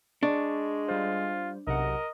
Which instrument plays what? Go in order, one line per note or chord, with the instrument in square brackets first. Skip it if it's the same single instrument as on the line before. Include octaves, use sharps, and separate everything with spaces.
[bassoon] G#3 [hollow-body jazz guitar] D4 [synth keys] C#6
[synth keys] G3 C5 [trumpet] F4
[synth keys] B1 C3 F#5 [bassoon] A#4 [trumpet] D#5